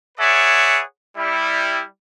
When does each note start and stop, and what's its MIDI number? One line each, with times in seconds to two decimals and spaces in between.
0.18 0.82 68
0.18 0.82 71
0.18 0.82 73
0.18 0.82 74
0.18 0.82 76
0.18 0.82 78
1.17 1.82 55
1.17 1.82 64